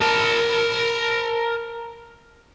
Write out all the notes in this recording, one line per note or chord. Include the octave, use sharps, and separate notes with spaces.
A#4 A5